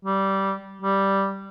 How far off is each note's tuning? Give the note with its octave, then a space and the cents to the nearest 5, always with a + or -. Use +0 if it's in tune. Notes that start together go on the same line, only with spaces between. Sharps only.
G3 -15
G3 -5